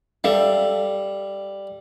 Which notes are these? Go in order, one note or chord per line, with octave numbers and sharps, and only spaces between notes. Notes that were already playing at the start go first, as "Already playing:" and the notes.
G3 A4 E5 F5